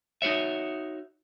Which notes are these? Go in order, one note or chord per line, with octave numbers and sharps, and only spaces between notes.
D#4 F#4 C#5 E5